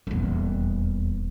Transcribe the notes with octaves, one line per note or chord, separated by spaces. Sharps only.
D#1 E2